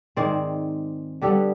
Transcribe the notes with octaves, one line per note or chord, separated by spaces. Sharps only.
G#2 D#3 G#3 C4 C5 D5
D3 G3 B3 G4 A4